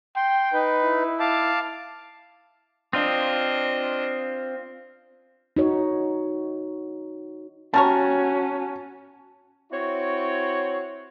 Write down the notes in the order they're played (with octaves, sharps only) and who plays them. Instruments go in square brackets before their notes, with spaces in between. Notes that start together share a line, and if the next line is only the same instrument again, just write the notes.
[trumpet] G5 [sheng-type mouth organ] C6
[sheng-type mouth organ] D#4 B4
[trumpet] E4
[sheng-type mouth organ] F5 A5 D6
[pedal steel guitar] C4 F4 [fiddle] D4 D#5
[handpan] D#4 F#4 C#5
[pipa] G3 A#4 C#5 [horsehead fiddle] C#4 F#4 [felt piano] A5
[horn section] C4 E4 F#4 C#5